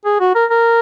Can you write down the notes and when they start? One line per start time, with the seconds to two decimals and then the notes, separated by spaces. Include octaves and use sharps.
0.05 G#4
0.20 F#4
0.35 A#4
0.50 A#4